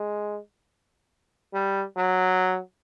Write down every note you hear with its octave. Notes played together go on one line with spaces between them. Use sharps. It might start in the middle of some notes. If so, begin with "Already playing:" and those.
Already playing: G#3
G3
F#3